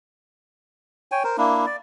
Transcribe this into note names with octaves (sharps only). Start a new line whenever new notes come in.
C#5 G5 G#5
A#4 C5
A#3 D4 E4
D5